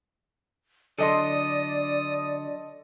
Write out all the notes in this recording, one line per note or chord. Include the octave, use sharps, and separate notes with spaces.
D3 F#3 A4 D5 D#5 C6 D#6